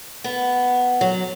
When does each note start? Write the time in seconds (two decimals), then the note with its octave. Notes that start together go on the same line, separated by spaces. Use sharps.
0.24 B3
1.01 F#3